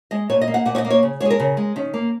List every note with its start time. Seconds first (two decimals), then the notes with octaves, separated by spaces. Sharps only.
0.11 G#3 D#5
0.29 A#2 C#5
0.41 D#5
0.48 A#3
0.54 F#5
0.65 A#2 F#5
0.75 C#5
0.78 D#5
0.85 A#3
0.90 C#5
1.03 C#3
1.20 G#3 G#4 C#5
1.30 A#4
1.40 C#3
1.57 G#3
1.76 D#3 C#4
1.94 A#3